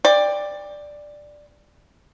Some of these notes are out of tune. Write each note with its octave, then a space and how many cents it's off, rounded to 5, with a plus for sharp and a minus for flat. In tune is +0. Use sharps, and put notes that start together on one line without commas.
D5 +5 G5 +25